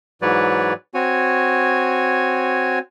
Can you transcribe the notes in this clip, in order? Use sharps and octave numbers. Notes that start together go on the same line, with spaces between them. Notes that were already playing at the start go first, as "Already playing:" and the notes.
G#2 E3 F#3 B4 C#5 D5
C4 F#4 C#5 G#5